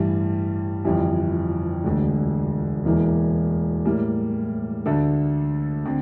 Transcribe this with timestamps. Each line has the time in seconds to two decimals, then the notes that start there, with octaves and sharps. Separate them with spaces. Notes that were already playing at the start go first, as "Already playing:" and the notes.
Already playing: A1 G2 E3 G3
0.85 G1 F2 E3 G3
1.84 E1 D2 D3
2.85 E1 E2 E3 A#3
3.85 A2 G3 A#3
4.86 D2 D3 A3 D4 A4
5.85 D3 C4